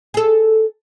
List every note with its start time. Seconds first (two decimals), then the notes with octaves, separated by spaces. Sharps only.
0.14 G#4 A4